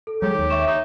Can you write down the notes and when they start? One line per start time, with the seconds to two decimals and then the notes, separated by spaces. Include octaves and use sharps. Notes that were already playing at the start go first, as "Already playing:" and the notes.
0.07 A4
0.22 F#3 G#3 G4 C#5
0.35 D#2 D#3
0.50 E5 C#6 E7
0.67 D#4